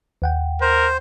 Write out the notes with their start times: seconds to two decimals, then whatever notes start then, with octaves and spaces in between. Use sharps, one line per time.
0.22 D#2 F#5 G5
0.61 A#4 C5